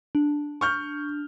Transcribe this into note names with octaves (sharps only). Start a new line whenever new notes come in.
D4
C#6 F6 G6